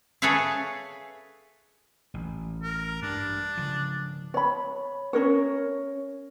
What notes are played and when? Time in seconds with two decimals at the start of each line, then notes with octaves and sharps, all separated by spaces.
0.22 G#4 A4 B4 C#5 E5 F5
2.14 A1
2.63 A#4
3.02 G2 D4
3.57 C#3 F3
4.34 C#5 B5
5.13 C#4 D4 A#4 C#5